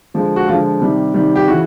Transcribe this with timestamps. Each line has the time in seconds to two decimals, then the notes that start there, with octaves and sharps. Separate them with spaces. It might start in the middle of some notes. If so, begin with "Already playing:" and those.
0.14 D3 F3 G#3
0.36 F#4
0.47 D3 F3 G#3 F4
0.81 C3 D#3 G3
1.14 C3 D#3 G3
1.36 G4
1.47 C#3 E3 F#4